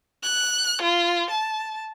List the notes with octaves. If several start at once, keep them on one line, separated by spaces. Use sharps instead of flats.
F#6
F4
A5